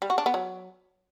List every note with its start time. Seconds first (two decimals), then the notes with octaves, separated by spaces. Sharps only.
0.02 G3
0.10 F#4
0.18 D4
0.26 B3
0.34 F#3